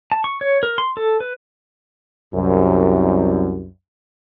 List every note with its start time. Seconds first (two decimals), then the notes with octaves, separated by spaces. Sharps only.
0.12 A5
0.24 C#6
0.41 C#5
0.63 A#4
0.78 C6
0.97 A4
1.20 B4
2.33 C2 F#2